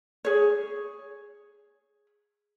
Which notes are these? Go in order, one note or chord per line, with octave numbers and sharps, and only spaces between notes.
G#4 C#5